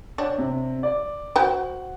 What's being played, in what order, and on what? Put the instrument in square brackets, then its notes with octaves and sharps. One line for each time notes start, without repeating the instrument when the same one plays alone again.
[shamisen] D4 [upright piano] C#5 G5
[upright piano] C3
D5
[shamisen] F#4 C5 G5 [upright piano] F#5